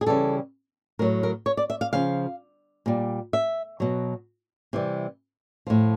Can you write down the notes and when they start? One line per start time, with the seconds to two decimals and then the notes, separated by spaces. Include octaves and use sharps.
0.01 G#4
0.06 C#3 E3 G3 A4
0.99 A2 A#4
1.02 F#3
1.23 A#4
1.46 C#5
1.57 D5
1.70 E5
1.81 F5
1.93 C#3 F3 F5
2.86 A#2 G3
3.33 E5
3.80 B2 F#3
4.73 C3 E3 G3
5.67 A2 F3